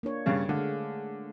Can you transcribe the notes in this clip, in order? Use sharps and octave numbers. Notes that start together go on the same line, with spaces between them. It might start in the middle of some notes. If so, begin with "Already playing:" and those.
A#3 D4 C#5
G2 C#3
D3 G#3 A3 F5